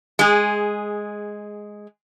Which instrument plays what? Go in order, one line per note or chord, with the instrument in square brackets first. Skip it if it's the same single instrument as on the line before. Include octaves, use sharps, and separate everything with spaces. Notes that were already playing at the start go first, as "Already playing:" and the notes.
[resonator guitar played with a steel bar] G#3 G#4